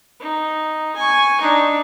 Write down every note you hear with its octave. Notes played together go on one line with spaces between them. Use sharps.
D#4
G#5 C#6
D4 D#4